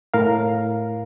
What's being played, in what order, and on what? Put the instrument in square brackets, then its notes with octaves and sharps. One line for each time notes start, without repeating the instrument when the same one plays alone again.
[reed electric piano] A2 A#4 F5